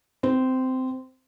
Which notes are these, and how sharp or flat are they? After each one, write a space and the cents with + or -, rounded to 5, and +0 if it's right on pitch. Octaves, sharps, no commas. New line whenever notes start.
C4 -15